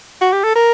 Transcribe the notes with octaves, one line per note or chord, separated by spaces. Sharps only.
F#4
G4
A4
A#4